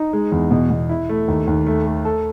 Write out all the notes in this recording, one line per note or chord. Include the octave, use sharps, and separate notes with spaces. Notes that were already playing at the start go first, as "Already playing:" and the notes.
Already playing: D#4
G#3
E2
B2
B2
E4
A3
D#2
D#2
A3
A3
A4